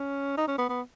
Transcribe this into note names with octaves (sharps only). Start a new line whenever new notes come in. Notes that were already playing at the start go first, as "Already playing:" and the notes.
Already playing: C#4
D#4
C#4
B3
B3